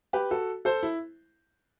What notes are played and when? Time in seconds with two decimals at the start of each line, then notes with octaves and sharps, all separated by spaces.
0.13 G4 B4
0.31 F#4 A4
0.65 A4 C5
0.83 E4